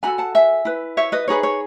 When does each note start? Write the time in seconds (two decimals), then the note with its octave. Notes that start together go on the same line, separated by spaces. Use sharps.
0.03 D#4 F#4 A4 G#5 B5
0.18 F#5 A5
0.35 E5 G#5
0.65 E4 B4
0.97 C#5 E5
1.12 B4 D#5
1.28 D#4 G#4 B4 C#5
1.43 C#5